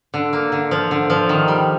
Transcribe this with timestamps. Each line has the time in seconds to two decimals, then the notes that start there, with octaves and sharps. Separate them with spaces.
0.14 D3
0.33 A#3
0.52 D3
0.71 F3
0.91 D3
1.10 F3
1.29 D#3
1.48 G3